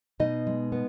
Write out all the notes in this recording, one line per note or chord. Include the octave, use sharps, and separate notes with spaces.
B2 D#4 D#5
G#3
B3